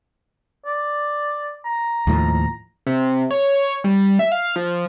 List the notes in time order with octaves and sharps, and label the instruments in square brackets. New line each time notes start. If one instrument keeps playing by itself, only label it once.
[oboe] D5
A#5
[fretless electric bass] D#2 A2 F3
[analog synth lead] C3
C#5
G3
E5
F5
F3